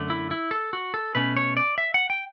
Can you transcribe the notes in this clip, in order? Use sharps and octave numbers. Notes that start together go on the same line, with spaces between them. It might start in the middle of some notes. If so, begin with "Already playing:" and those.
Already playing: F#2 D3 A3
E4
E4
A4
F#4
A4
B2 A3 C#4 B4
C#5
D5
E5
F#5
G5